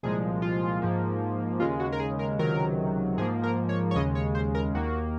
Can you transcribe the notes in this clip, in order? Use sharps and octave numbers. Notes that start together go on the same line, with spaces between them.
C2 A#2 F3 G#3 G#4
F4
G#2 F3 A#3
D#2 C#3 G#3 F4
F#4
A#4
G#4
A#4
C#2 C3 D#3 F#3 A#4
G#2 F3 A#3 G#4
A#4
C#5
C#5
D#2 C#3 G#3 D#5
C#5
C5
A#4
D#2 D#3 A#3 F#4